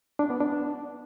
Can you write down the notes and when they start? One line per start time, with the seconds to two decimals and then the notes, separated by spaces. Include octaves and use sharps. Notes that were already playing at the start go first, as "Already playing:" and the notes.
0.19 D4
0.30 B3
0.41 D4